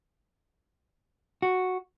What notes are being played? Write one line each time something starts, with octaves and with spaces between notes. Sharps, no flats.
F#4